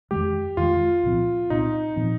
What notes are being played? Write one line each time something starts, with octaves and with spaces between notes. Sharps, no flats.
F2 D#3 G#3 G4
F2 D#3 G#3 F4
C2 A#2 F3 C4
C2 A#2 F3 C4 D#4
A#2 F3 C4